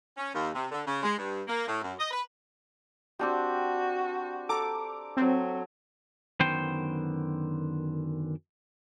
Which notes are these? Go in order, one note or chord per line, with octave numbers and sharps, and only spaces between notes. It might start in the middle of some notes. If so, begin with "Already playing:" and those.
C#4
D#2
C3
D3
C#3
G#3
G2
A#3
A2
F#2
D#5
B4
C4 D4 F#4 G4
A4 A#5 D6
F#3 C4
F#2 D3 D#3 B3 C5 G5